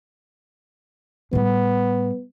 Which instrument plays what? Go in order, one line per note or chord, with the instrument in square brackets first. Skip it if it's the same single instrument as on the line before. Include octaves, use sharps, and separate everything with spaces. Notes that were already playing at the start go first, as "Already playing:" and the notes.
[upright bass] A2 G3 [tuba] B3